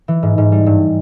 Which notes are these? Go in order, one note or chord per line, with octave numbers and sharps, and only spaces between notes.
E3
G#2
G#2
G3
G2